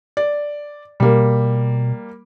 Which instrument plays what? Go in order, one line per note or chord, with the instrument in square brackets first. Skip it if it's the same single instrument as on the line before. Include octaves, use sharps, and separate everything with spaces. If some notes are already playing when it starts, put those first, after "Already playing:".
[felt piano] D5
[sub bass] B2 [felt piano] G3 A#3